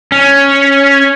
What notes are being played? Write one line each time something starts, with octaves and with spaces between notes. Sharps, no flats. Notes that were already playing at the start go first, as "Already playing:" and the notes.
C#4